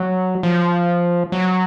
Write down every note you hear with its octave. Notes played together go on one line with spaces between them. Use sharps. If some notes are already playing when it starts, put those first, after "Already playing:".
Already playing: F#3
F3
F#3